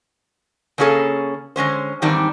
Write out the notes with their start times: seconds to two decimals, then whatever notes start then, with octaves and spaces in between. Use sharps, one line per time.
0.78 C#3 A#3 C#4 G#4 A4
1.56 D3 G#3 C#4 C5
2.02 E2 G#2 D#3 G3 C4 D4